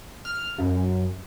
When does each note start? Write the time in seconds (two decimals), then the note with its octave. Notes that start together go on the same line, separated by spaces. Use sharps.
0.25 F6
0.58 F#2